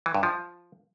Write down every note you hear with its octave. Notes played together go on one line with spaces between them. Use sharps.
E3
G2
F3